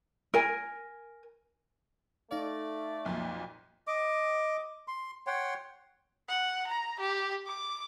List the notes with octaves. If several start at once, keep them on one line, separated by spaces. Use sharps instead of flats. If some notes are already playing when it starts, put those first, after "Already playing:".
A#4 G#5
A3 D#4 D5 F5
B1 F2 A#2
D#5 D6
C6
C#5 F#5 G5 C6
F#5
A#5
G4
D6